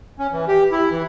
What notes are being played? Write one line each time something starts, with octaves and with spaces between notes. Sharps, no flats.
C#4
E3
G4
E4
E3